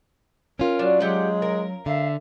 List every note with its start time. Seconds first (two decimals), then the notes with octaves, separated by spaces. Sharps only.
0.59 C#4 F4 A#4
0.79 F#3 D4
1.00 F#3 G#3 G4 F#5
1.42 A#4
1.86 D3 E5 F5